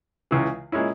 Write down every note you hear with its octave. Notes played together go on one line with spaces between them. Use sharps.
C#2 C#3 E3
A#2 G#3 C#4 E4